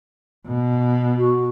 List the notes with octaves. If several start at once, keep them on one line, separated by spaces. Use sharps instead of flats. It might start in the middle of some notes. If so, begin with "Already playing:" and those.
B2
F#4